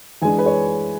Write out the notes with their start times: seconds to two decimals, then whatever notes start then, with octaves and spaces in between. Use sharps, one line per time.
0.21 E3 G#3 D4 G#5
0.39 B4
0.46 C#5